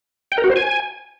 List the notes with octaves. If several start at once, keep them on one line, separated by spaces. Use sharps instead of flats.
G5
A#4
F#4
C5
G#5